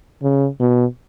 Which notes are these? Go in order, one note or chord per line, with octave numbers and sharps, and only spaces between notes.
C#3
B2